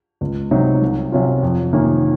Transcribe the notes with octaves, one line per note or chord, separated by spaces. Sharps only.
C#2
C3 F#3 C4 D#4
C2
C3 F#3 C#4 F4
F2
C3 D#3 A#3 C#4